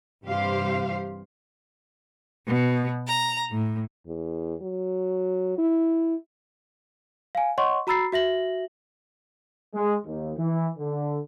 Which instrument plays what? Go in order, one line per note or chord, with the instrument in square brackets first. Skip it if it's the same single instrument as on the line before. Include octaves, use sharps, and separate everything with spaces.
[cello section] G2 C3 E3 G4 C5 F5
[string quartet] B2
A#5
A2
[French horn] E2
F#3
E4
[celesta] F5 G#5
C#5 D#5 F#5 C6 C#6
F#4 A#5 B5 E6 A6 C7
F#4 E5 A#6 F#7
[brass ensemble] G#3
D#2
E3
D3